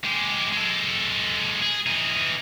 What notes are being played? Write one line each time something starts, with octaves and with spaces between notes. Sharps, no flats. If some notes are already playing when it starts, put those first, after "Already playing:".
G#3 G4
G#3 A4
G#4
E3 D#4